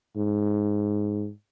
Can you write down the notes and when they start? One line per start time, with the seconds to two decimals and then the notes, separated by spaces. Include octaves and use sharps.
0.16 G#2